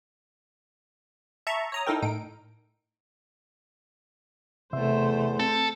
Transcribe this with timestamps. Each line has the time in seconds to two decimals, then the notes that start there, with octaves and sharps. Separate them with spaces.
1.47 E5 A5 A#5 C#6
1.72 C#5 A#5 D#6
1.87 D#4 E4 A4 A#4 G5
2.02 A2 D#4 D7
4.73 E2 C3 A3 C5 E5 C6
5.40 C4 A4